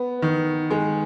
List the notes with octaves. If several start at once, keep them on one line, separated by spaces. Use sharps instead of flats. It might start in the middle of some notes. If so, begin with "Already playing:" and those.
Already playing: B3
D#3
G#3